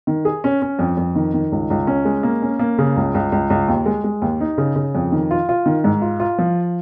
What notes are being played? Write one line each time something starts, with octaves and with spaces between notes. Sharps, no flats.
D#3
G#4
C#4
C#4
F2
F2
D#3
D#3
C#2
C#2
C#4
G#3
A#3
C#4
A#3
C#3
C#2
C#2
C#2
C#2
D#2
G#3
G#3
D#2
D#4
C#3
C#3
F2
D#3
F4
F4
D#3
G#2
F4
F4
F3